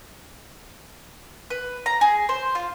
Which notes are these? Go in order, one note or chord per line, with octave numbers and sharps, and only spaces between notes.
B4
A#5
G#4
C5
F4